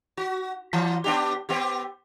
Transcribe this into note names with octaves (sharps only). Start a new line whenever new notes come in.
F#4
E3
B3 D4 G4
B3 C4 G4